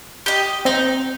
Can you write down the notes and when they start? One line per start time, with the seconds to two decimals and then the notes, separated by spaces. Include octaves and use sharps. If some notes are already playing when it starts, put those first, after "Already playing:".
0.26 G4 D#5
0.65 C4 D#4